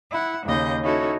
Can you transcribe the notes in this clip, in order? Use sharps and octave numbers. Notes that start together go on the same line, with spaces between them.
E4 F#5
D#2 C#3 D#5 G6
C#4 D#4 E4 F#4 A4 C#5